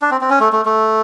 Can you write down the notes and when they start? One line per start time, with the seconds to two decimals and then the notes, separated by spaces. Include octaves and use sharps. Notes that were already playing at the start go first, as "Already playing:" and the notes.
0.02 D4
0.11 C4
0.21 C4
0.30 C#4
0.40 A3
0.53 A3
0.65 A3